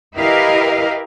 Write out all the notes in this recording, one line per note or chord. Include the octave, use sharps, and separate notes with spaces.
E4 G4 A#4 B4 D#5 F5